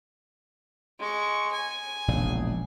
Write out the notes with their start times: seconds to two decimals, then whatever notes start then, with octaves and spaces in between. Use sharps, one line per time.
0.99 G#3 C#6
1.52 G#5
2.08 E1 A#1 C#3